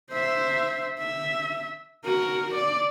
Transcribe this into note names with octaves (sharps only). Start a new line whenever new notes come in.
C5 E5
E5
F#4 A#4
D5